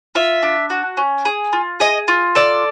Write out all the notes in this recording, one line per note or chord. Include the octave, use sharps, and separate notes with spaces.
F4 E5
D4
F#4
C#4
G#4
F4
G#4 D#5
F4
A4 D5